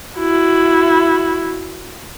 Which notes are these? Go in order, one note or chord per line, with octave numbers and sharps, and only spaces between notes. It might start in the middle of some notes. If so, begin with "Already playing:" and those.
E4 F#4